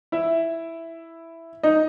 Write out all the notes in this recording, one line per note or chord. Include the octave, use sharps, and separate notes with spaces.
E4 E5
D#4 D#5